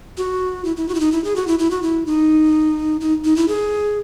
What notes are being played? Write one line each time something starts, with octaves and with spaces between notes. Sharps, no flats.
F#4
E4
E4
F#4
E4
D#4
E4
G#4
F#4
E4
E4
F#4
E4
D#4
D#4
D#4
E4
G#4